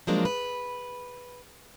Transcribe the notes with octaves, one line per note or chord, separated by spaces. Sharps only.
F3 F#3 G#3 A#3 D4
B4